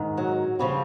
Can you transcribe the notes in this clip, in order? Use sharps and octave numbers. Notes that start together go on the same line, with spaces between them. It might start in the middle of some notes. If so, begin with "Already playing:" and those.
Already playing: G#2 D#3
F#3
C#3 F3 G3